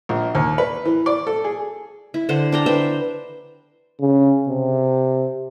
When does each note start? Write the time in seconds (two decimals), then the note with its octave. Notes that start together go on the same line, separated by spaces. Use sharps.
0.09 A#1
0.35 D#2
0.58 B4
0.85 E3
1.06 D5
1.27 A4
1.44 G#4
2.14 E4
2.29 D3 C5 F#5
2.52 D4 G5 A#5
2.66 B4 C5 E5 G5
4.01 C#3
4.49 C3